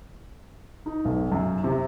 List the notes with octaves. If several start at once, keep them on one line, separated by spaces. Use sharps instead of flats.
D#4
B1
F#2
C3